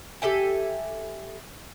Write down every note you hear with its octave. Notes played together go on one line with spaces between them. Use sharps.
G4 A4 E5 G#5